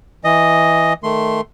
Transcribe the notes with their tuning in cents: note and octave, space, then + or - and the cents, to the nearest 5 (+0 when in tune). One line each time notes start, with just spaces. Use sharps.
E3 +0 D#5 +0
D#3 +0 A3 +0 C6 +0